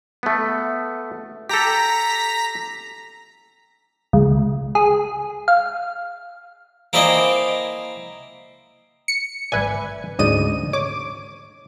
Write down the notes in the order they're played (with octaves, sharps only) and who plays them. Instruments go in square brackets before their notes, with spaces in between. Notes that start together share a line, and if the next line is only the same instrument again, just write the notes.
[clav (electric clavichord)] A3 B3
[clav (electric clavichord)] G4 A4 [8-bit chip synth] A#5 A#6 B6
[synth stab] C#2
G#4
F5
[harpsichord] A#3 C4 E4 D5 D#5 G#5
[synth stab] C#7
[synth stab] G#1 B4 G#5 [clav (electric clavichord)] D5 E5
[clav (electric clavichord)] D2 G#2 D5 [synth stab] C#3 D#5 D#7
[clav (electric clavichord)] C#5 [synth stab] D6